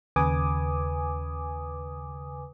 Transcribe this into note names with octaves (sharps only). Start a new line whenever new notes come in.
D#2 C#3 B4 G#5 D6 D#6